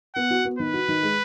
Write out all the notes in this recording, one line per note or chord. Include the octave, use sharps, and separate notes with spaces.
B3 F#5
F#4
B3
D#3 B4
F#4
D#3
G#3